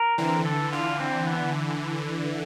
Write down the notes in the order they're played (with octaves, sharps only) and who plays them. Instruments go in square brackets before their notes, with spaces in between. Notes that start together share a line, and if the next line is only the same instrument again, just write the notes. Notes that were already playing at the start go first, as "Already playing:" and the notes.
Already playing: [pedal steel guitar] A#4
[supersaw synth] D3 E3 [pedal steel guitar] C4
[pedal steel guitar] A4
[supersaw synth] D3 [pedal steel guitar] F4
[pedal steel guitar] C4
B3